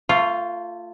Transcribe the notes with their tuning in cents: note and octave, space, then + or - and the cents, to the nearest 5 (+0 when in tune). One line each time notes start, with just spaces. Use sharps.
A3 +30 F4 +0